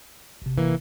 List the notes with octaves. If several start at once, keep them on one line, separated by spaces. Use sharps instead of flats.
G#1 C3
E3 A#3